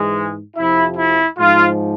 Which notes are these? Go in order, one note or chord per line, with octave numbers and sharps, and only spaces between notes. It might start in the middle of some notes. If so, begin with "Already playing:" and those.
Already playing: G#2 E3 G#3
F2 C3 F3 E4
E4
G#2 F3 F4